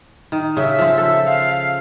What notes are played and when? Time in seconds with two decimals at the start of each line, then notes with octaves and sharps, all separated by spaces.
0.32 D#3
0.57 C#3 E5
0.79 F3 F4
0.98 A4
1.26 F5